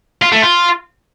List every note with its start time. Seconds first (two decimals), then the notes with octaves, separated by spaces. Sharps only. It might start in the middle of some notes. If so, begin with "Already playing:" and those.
0.22 F4
0.32 A3
0.43 F4